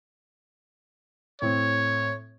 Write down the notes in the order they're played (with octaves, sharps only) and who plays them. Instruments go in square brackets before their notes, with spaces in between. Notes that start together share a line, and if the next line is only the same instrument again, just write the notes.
[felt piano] A2 C4 [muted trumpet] C#5